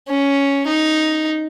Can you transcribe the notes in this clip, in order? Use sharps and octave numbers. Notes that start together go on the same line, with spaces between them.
C#4
D#4